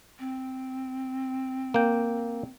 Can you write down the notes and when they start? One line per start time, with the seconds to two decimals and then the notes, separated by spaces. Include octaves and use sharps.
0.19 C4
1.74 A#3 G5